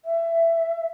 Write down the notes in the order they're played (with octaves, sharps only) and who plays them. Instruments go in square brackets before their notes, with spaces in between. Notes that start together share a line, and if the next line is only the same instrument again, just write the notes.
[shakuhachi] E5